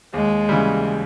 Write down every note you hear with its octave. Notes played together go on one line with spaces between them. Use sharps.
D#2 G#3
C#3 E3 G3